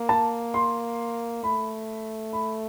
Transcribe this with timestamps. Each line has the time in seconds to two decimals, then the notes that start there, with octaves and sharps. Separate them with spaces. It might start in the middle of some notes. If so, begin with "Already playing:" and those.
Already playing: A#3
0.09 A5
0.54 C6
1.43 A3 B5
2.33 B5